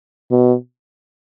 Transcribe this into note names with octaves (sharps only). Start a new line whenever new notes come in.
B2